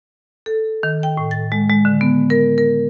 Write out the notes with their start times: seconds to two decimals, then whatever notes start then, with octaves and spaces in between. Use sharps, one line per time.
0.46 A4
0.83 D#3
1.03 G5
1.17 A2
1.31 A6
1.52 G#3
1.69 G#3
1.85 D3
2.01 B3
2.30 A#4
2.58 A#4